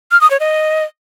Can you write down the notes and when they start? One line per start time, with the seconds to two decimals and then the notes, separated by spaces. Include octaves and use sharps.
0.11 F6
0.21 D#6
0.30 C#5
0.40 D#5